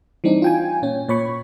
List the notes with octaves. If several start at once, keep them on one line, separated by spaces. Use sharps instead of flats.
E3 G3 C4 D4 D#4
F4 G5 G#5
A#2 C#4
A#2 C#5 B5 C#6